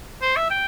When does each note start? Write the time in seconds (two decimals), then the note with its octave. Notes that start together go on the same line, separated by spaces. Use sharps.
0.22 C5
0.36 E5
0.51 G5